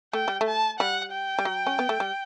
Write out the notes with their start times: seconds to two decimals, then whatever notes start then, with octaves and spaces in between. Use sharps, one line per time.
0.13 A3 G5
0.28 G3
0.41 A3
0.47 A5
0.79 G3 F#5
1.12 G5
1.39 G3
1.45 F#3
1.67 C#4
1.79 B3
1.89 A3
2.00 G3